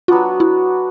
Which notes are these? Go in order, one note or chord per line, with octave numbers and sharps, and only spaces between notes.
F#3 B3 D4 F4 F#4
E4